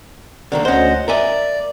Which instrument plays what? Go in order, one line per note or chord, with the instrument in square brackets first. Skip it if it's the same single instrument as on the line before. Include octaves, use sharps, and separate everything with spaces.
[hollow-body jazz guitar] D3 D#3 A#3
[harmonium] D2 D#5 F#5 [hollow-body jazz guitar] C#4 C5
[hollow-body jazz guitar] A#4 E5 G#5 [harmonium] D5